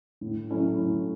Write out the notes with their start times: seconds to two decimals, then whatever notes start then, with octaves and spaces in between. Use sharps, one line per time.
0.21 A2
0.50 F#3 A3 C#4 E4
0.78 A2